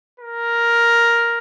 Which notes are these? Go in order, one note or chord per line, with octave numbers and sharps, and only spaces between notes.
A#4